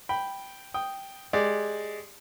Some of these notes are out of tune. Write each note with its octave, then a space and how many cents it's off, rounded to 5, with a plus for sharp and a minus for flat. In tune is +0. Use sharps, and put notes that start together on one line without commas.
G5 +0 B5 +0
G5 +0 D#6 +0
G#3 +10 G4 +20 D5 +5